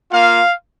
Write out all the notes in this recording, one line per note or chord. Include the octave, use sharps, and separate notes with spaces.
A#3 F4 F5